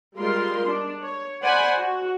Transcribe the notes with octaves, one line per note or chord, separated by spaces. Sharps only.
G3 G#3 F4 A#4 C6
D4
C#5
C5 D5 F#5 G#5 B5
F#4